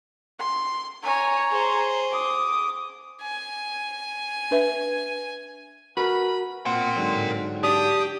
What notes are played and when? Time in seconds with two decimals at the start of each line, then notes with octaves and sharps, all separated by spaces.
0.40 C6
1.04 C#5 G#5 A#5
1.50 G#4 C5
2.12 D6 D#6
3.22 G#5
4.51 D4 B4 E5
5.97 F#4 A#4 B4 B5
6.66 A#2 C4 A#4 F#5 C6
6.96 G#2 D3 F#3
7.63 D4 G4 D#6